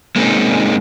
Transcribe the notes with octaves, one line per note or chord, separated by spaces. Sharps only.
G#3 A#3 C4 C#4 D#4